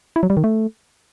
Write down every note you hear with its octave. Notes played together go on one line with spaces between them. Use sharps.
E4
F#3
G3
D#3
A3